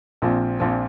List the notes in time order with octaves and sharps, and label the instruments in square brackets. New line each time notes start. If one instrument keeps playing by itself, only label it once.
[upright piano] A#1 A#2 F3 C4
A#1 A#2 F3 C4